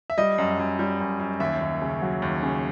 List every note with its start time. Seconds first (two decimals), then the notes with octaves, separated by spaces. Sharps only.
0.10 E5
0.18 G3 D#5
0.38 F#2
0.59 F#2
0.79 G3
1.00 F#2
1.20 F#2
1.40 D#2 E5
1.61 D#2
1.82 C#3
2.02 F#3
2.22 D#2
2.43 C#3